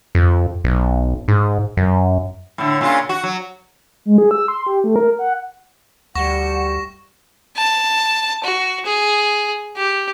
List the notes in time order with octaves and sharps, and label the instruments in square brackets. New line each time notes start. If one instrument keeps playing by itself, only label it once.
[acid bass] F2
B1
G#2
F#2
[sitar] A2 D3
A#2 C#3 F4
F#4
F#3
[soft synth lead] G#3
G#4
E6
C6
G4
A3
A#4
F#5
[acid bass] D2 [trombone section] G3 [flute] F#5 [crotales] C#6 A#6 E7
[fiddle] A5
F#4
G#4
G4